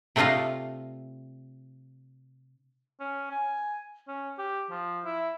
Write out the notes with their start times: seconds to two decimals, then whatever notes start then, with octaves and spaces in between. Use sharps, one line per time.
0.16 C3 A3 D4 F4 D#5 F5
3.00 C#4
3.31 G#5
4.08 C#4
4.38 G4
4.70 F3
5.05 E4